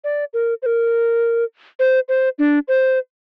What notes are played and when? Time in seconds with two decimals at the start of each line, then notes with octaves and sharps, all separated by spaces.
0.04 D5
0.34 A#4
0.62 C5
0.66 A#4
1.79 C5
2.09 C5
2.39 D4
2.68 C5